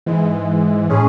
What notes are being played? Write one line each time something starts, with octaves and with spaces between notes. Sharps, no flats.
G#2 E3 G#3
A2 G#3 C#4 G#4